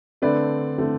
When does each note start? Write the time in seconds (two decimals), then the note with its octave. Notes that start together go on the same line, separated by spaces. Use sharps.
0.22 D3 A3 C4 B4 D5
0.78 D3 A3 C4